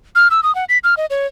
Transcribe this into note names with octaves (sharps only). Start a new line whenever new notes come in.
F6
E6
D#6
F#5
B6
F6
D#5
C#5